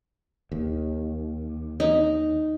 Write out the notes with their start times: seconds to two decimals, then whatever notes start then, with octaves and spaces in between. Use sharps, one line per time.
0.52 D#2
1.80 D#4